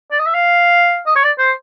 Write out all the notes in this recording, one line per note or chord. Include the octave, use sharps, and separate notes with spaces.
D5
D#5
E5
F5
D#5
C#5
D5
C5